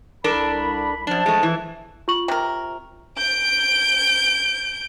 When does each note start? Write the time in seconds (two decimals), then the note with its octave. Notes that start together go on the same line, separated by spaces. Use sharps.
0.24 C2 D4 A4 A#4 B5
1.07 F#2 F3 D4 A5
1.26 G#3 A3
1.43 E3
2.08 F4 C#6 F#7
2.28 C3 A#4
3.18 G6 D7